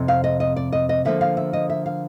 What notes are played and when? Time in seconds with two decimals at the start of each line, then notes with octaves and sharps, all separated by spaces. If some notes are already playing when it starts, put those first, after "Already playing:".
Already playing: F2 C3
0.08 F5
0.24 D#5
0.40 D#5
0.56 D5
0.72 D#5
0.89 D#5
1.05 D3 F3 A#3 E5
1.21 F5
1.37 E5
1.53 D#5
1.70 E5
1.86 F5